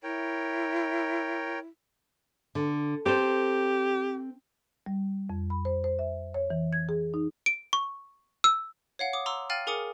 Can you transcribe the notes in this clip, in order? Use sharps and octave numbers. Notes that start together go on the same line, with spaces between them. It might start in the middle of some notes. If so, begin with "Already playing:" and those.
E4 A#4 C#5 G5
D3
C4 G4 A4 C5
G3
F2
B5
C5
C5
E5
C#5
E3
G#6
G#4
D#4
D7
C#6
E6
C#5 F5 F#5
D6 D#6
A#5 C6 D6 E6
F5 G5 F6 A6 D#7 F#7
G#4 A#4 G#5 D6 D#6 C#7